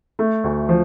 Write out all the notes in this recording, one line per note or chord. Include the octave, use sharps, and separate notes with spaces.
A3
D2
F3